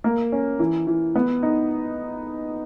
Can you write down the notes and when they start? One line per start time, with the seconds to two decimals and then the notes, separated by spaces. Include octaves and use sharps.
0.04 A#3
0.32 C#4
0.59 E3
0.87 E3
1.16 B3
1.43 D#4